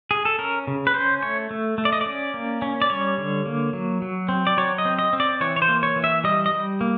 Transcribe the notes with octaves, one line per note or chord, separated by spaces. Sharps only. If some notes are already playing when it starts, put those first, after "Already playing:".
G#4
A4
C#4 A#4
C#3
B4
C#4 C5
A3 C#5
A3
A3
D5
D#5
C#4 D5
A#3
C#4
D5
G3 C#5
D3
A#3
F#3
F#3
C4
D5
F#3 C#5
D#5
C4
D#5
C4
D5
E3 C#5
C#5
C5
A#3
C#5
E3
E5
G3 D#5
D#5
G3
A#3